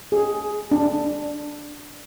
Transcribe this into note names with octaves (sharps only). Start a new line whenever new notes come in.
G#4
D4